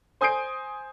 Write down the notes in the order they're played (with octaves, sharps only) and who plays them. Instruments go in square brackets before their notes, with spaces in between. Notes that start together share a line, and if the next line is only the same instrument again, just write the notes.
[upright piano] C5 G#5 D#6 G6 C7 D7